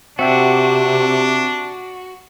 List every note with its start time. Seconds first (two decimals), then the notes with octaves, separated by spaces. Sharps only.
0.19 C3 C4 D4 F#4 E5 G5